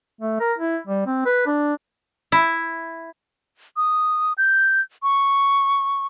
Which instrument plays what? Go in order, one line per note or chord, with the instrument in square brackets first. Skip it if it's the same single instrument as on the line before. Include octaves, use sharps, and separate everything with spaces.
[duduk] A3
A#4
E4
G3
C4
B4
D4
[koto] E4
[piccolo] D#6
G6
C#6